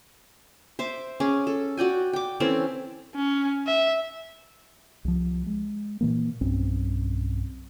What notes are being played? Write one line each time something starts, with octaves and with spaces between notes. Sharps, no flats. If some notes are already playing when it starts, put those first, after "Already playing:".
C5 E5 D6
C#4 G#4 D6
A4
F#4 D5 G5 G#5
G5 D6
E3 C4 C#4 A4
C#4
E5
C2 F3
G#3
A#2 E3 A#3
B1 G2 C4 C#4